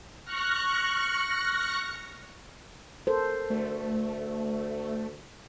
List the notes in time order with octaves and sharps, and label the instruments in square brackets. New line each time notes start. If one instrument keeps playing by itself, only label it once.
[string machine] C#6 F6 F#6 A#6 C#7
[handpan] A4 A#4 C5
[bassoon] D2 [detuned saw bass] A3